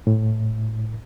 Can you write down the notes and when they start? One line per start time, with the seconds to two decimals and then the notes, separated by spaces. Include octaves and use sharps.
0.07 A2